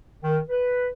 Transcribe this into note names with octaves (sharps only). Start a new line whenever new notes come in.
D#3
B4